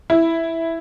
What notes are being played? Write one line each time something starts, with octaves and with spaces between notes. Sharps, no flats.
E4